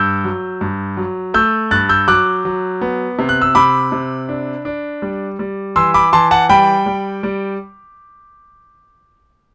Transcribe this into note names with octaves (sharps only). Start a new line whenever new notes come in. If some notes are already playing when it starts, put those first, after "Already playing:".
Already playing: G2 E6 G6
F#3
G2
F#3
A3 E6 G6
G2 F#6 A6
E6 G6
F#3 D6 F#6
F#3
B3
C3
F#6
E6
C3 B5 D6
C3
D4
D4
G3
G3
E3 C6 E6
B5 D6
E3 A5 C6
F#5 A5
G3 G5 B5
G3
G3